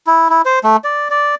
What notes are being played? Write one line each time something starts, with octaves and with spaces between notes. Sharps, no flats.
E4
E4
C5
A3
D5
D5